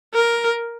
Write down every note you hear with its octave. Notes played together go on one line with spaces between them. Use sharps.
A#4